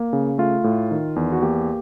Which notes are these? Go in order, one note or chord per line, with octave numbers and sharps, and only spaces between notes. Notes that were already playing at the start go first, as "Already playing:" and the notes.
Already playing: A#3
C#3
A3 F4
A2
D#3
E2
F#4
A#3 G4